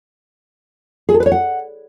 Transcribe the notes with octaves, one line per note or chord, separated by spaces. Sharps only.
G#4
A4
B4
C#5
F#5